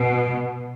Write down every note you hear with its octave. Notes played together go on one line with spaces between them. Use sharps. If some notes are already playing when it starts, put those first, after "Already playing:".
Already playing: B2